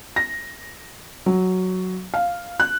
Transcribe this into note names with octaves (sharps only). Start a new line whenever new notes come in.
A#6
F#3
F5
F#6